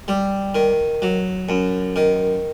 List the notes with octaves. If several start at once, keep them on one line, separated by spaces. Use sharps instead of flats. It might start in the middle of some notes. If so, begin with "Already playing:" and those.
G3
D#3
F#3
F#2
D#3